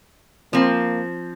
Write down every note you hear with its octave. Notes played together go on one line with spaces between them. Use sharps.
F3 A#3 C4